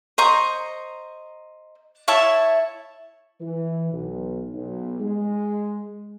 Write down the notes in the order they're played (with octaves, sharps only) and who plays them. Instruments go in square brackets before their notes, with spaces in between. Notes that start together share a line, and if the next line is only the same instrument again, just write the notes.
[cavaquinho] C5 D#5 A#5 C#6
E4 C#5 E5 A5
[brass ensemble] E3
B1
B1
G#3